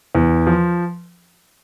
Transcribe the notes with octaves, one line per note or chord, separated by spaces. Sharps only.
E2
F3